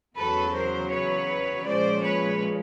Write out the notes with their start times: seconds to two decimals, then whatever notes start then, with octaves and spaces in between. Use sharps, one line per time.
0.16 E2 C#3 F#3 A4 B4
0.53 A#4 C5
0.91 B4 C#5
1.64 A#2 F3 G#3 C#4 C5 D5
2.02 B4 C#5